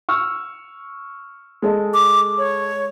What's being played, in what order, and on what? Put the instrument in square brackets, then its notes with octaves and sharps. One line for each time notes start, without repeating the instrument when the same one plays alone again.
[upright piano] C#6 E6 F6
G#3 A4 D#5
[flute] D6
C#5